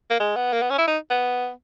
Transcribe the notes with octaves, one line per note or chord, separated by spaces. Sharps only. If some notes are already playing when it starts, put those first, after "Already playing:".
A#3
G#3
B3
A#3
B3
C#4
E4
D#4
B3